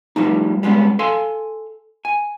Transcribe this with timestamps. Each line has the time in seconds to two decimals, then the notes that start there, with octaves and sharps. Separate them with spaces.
0.16 F3 G3 A3 D#4
0.63 G3 G#3 B3 C#4
0.99 A4 F5 G#5 C6
2.05 G#5